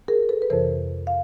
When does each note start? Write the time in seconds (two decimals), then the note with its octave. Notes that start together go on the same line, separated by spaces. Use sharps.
0.08 G#4 A#4
0.29 A4 B4
0.42 B4
0.50 F2 C3 E3 A#4 C5
1.07 F5